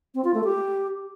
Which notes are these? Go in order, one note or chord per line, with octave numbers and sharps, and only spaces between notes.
C4
F4
A3
G4